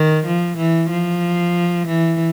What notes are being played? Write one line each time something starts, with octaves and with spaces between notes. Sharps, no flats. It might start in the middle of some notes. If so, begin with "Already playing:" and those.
Already playing: D#3
F3
E3
F3
E3